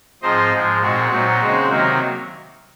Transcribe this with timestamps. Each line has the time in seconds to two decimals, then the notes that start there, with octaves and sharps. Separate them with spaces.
0.22 G#2 F3 C4 D#4 C5 D#5
0.52 G#2 F3 G#3
0.81 A#2 G#3 C4 D#4 F#4
1.11 A#2 F#3 C4 D#4
1.40 C#3 G#3 C4 D#4
1.70 C3 D#3 F#3 A#3 D#4 F#4